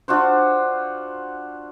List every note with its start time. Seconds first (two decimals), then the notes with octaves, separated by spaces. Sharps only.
0.08 D4 F4 F#4 C5